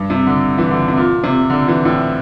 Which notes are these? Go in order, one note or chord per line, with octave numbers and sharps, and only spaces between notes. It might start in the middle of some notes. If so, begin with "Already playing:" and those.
Already playing: G2
C3
D3
E3
D3
C3
A#2
C3
D3
E3
A2